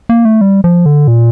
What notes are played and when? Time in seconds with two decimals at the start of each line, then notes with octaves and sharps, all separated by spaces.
0.09 A#3
0.25 A3
0.41 G3
0.64 F3
0.86 D3
1.08 A#2